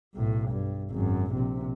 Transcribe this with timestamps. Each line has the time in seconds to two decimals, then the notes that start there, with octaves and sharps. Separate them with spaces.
0.15 B1 A2
0.50 G2
0.91 G#1 F#2
1.32 A#1 C3